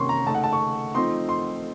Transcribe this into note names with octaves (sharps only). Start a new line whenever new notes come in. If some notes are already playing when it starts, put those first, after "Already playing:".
Already playing: C3 D#3 A#3 C#4 C6 C#6
A#5
C#3 A3 D#4 A5
F#5
A5
C#6
F3 A3 C4 D#4 C6
C6